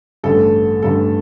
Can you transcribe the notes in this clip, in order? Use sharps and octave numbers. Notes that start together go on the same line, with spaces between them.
A1 G2 D3 A3 A4
A1 G2 D3 A3 A4